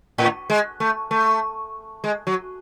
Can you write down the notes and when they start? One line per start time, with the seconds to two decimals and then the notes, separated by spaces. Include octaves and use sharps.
0.18 A2
0.50 G#3
0.80 A3
1.11 A3
2.04 G#3
2.27 F#3